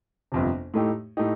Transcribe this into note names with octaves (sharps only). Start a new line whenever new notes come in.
G1 F2 C3
A2 A3 D#4 G4
A2 A3 D#4 G4